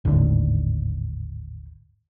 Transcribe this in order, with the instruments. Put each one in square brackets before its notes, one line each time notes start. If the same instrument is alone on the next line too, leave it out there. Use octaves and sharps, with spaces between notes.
[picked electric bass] G#1 D#2 A2 D3